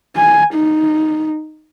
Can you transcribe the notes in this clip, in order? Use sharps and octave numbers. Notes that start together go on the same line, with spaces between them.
G#5
D#4